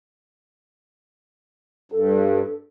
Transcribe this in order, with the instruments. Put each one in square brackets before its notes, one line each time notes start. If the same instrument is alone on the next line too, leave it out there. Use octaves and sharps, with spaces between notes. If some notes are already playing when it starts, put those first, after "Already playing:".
[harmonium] G2 [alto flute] A4